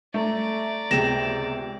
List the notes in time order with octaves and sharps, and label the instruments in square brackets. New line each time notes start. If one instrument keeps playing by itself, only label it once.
[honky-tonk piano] A3 [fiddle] D5 A#5
[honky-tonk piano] C#2 C3 [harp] B3 G#4 G5 [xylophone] A#6 E7